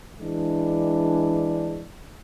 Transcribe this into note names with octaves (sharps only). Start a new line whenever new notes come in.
E3 G#3 D4